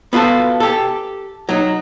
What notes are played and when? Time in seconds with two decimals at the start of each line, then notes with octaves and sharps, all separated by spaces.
0.13 B3 F4 F#4 A4
0.60 G4 A4
1.49 F#3 D#4